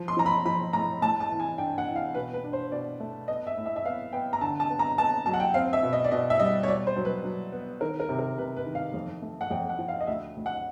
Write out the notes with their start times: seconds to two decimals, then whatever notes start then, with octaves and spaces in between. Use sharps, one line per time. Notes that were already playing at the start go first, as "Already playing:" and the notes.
Already playing: F3
0.08 C6
0.17 F3 A#5
0.26 B5
0.46 F3 B5
0.73 A2 A#5
1.02 A2 A5
1.20 A5
1.30 E3
1.40 G#5
1.58 D4 G5
1.78 F#5
1.87 E3
1.96 F5
2.14 B2 B4
2.33 B4
2.44 D4
2.53 C5
2.72 B2 D5
3.00 A3
3.28 B3 D#5
3.47 E5
3.57 A2
3.66 E5
3.76 E5
3.85 B3 F5
4.13 B3 G5
4.33 A#5
4.41 D3 A5
4.60 A5
4.69 B3
4.79 A#5
4.98 B3 A5
5.26 F#3 A5
5.34 F#5
5.40 G5
5.54 C4 F5
5.73 E5
5.83 B2
5.93 D#5
6.04 D5
6.11 B2 D#5
6.30 E5
6.40 G3 D#5
6.63 C#5
6.68 B2 D5
6.87 C5
6.96 F#3
7.05 B4
7.24 F#3
7.52 B3
7.81 D#3 A#4
8.00 A#4
8.09 C3
8.19 A#4
8.38 C3 B4
8.56 B4
8.66 D#3
8.75 F5
8.94 F2
9.22 A3
9.41 F#5
9.51 F2 G5
9.69 F#5
9.79 F3
9.88 F5
10.01 D#5
10.07 D2 E5
10.36 D2
10.46 F#5